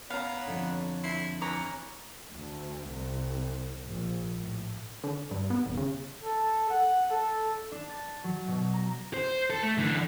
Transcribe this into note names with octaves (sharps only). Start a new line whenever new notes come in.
B3 C#5 F5 A#5
F2 D3
E4 C6
E3 C#5 A#5 D6
D2
C2
A#1
A2
D3
G2
B3
D#1
C#3
A4
F#5
A4
D4
A6
F#3
B2
A#5
C5
A4
A3
D3 E3